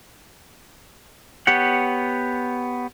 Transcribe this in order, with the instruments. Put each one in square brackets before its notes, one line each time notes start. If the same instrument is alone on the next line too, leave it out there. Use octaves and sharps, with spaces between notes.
[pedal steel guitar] B3 G4 C#5 F#5